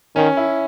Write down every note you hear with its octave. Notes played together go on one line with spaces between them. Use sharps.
D#3 C#4
E4